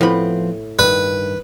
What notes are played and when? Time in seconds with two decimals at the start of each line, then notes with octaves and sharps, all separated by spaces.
0.01 A2 F3 B3 C4 B5
0.79 G2 D#3 B4